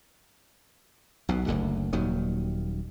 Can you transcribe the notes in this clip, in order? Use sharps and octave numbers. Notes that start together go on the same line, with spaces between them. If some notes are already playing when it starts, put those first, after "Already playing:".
B1 B2
F#1 D2 D3
D#1 D#2 D#3 F#3